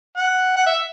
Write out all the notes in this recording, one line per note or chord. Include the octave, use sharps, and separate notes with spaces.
F#5
F#5
E5